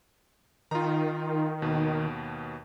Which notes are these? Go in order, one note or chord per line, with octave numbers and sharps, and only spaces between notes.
D#3 F4 A#5
D#2 B2